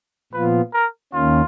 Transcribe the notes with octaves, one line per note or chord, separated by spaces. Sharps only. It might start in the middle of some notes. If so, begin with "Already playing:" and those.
A#2 F3 B3 F4 B4
A#4
D#2 D#3 A#3 C#4 F4